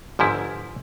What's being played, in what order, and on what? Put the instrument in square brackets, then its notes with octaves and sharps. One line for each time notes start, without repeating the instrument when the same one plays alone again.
[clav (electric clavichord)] G1 G#2 F3 E4